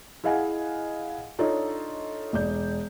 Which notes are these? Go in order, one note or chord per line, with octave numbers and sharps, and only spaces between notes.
E4 G#4 D#5 F5 F#5 G#5
D4 D#4 F4 A4 C#5 D#5
E1 D5 G6